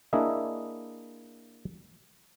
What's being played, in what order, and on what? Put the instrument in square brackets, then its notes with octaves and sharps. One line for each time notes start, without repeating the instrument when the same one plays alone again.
[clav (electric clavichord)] A#3 D4 E4 G#4 D#5 E5